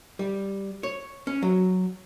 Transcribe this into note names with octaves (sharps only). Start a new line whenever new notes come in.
G3
C#5
C#4
F#3